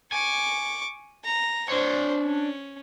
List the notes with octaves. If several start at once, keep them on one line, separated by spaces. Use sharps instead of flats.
G#5 C#6 D6
A#5
D4 C5 C#5
C#4